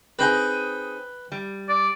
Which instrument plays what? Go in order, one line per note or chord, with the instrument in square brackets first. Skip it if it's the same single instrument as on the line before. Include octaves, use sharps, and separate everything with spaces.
[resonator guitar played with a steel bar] C4 D#4 G#4 [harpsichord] B4 G5
[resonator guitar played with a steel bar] G3
[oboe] D5